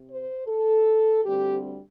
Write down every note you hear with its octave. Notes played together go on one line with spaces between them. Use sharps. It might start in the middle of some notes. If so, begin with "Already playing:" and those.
Already playing: C3
C5
A4
D2 D3 G3 C4 G4